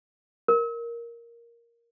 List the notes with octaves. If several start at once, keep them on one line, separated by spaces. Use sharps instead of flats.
A#4